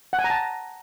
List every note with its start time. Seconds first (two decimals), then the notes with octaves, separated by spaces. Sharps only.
0.13 F#5
0.19 G#5
0.24 A#5
0.30 A5